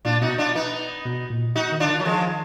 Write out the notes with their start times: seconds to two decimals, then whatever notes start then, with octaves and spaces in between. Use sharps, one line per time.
0.05 A#2 D4 F4
0.21 B2 D#4 F#4
0.38 D4 F4
0.55 B3 D#4
1.05 B2
1.30 A#2
1.56 D#4 F#4
1.72 D#3
1.80 D3 D4 F4
1.88 D#3
2.00 F#3
2.05 D#3 F3 G#3